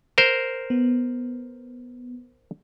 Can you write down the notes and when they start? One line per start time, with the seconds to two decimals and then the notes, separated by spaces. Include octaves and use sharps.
0.18 A#4 C5
0.70 B3